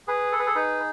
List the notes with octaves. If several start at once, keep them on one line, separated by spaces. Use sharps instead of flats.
G#4 B4
A4
B4
A4
D#4 B4